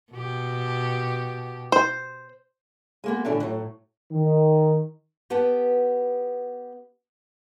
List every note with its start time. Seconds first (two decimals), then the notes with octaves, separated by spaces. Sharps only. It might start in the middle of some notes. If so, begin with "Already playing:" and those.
0.13 B2 G4
1.72 C5
3.04 G#3 A#3 B3
3.25 A2 D3 E3 D4 F#4
3.41 A2 F#3
4.11 D#3
5.30 B3 G4 B4 F#5 A5